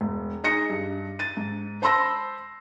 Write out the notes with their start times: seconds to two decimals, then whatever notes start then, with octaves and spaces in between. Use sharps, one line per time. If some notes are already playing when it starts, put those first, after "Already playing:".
0.01 E1
0.44 D#4 G#4 A#6 C#7
0.70 G2
1.19 A6 D#7
1.37 G#2
1.82 C5 A5 B5 C6 E6 A#6